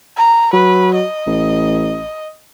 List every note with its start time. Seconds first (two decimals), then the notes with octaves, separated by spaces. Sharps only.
0.17 A#5
0.53 F#3 B4
0.95 D#5
1.27 A1